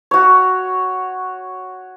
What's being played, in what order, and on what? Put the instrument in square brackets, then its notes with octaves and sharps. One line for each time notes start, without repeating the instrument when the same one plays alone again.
[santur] F#4 C#5